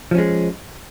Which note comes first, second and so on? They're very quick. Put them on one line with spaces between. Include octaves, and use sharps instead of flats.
F3 C#4 G#3